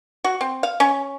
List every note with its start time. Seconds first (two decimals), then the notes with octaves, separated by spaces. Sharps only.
0.24 F#4
0.41 C4
0.63 F5
0.80 C#4